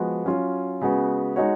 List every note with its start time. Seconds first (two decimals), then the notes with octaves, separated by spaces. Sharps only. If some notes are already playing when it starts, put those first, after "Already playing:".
Already playing: F3 G#3 B3 F#4
0.25 F#3 C#4 F4
0.82 C#3 G#3 B3 F#4
1.36 G#3 D#4 F#4 C#5